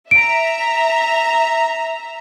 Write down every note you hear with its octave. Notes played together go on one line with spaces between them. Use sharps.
E5 A#5 D7